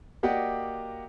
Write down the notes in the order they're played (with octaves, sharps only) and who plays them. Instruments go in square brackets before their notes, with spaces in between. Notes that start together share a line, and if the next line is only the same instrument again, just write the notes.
[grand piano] A#3 F#4 G4 D5 D#5 F#5